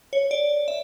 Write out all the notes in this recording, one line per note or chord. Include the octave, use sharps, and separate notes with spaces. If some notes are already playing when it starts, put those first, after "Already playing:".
C#5
D5
E5